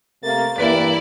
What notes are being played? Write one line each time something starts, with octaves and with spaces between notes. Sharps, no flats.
C3 A3 A#3 A6
G2 E3 A#3 E4 B4 D5 B6